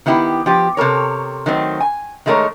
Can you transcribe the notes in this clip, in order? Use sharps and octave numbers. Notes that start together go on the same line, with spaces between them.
D#3 B3 E4 G4
F3 G4
C3 A4 A#4 C#5
D#3 F#3 A3 C4
G#5
D#3 G#3 A3 G4 A#4 C#5